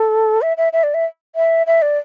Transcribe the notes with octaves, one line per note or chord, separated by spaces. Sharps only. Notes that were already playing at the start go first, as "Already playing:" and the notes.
Already playing: A4
E5
E5
E5
D5
E5
E5
E5
D5